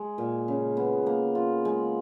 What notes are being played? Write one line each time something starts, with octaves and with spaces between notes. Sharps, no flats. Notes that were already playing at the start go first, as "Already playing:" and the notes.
Already playing: G#3
A#2
C#3
B3
A#3
F4
G#3